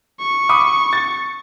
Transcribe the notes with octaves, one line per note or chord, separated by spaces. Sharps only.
C#6
B5 D6 D#6
A6